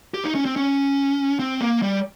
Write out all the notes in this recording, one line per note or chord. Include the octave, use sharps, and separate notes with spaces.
G4
D#4
C#4
C4
C#4
C4
A#3
G3